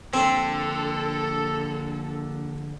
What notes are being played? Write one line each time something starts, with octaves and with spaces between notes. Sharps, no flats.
A#1 D3 C4 A4